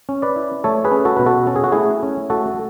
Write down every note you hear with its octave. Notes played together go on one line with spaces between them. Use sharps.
C#4
B4 D5
E4
A3 A4 C#5
G#4 B4
C#4
F#4 A4
B2 B4
F#4 A4
C#4 A4
G#4
F#4
A3 E4 G#4
C#4
A3 F#4 A4